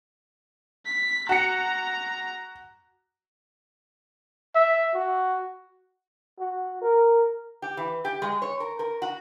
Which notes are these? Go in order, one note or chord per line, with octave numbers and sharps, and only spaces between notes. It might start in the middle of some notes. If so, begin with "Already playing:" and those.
B6
F#4 A#5 C#7
E5
F#4
F#4
A#4
G4
E3
G4
G#3
C#5
A#4
A#4
F#4